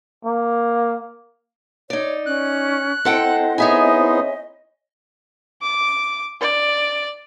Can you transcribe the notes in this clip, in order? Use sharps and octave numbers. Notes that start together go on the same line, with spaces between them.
A#3
D#4 C#5 D5
C#4 F#6
C4 E4 A4 C5 D#5 F#5 G5
B3 D#4 G#4 C#5 E5 G#5
D6
D5